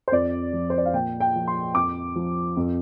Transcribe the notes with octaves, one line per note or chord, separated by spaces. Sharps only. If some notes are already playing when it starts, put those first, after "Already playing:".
C5
F2 D5
F3
C5
D5
F5
A#2 G5
G5
F3
C6
F2 D6
F3
F2